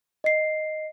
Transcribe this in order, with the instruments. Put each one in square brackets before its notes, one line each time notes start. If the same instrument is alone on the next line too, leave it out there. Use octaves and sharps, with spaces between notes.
[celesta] D#5 C7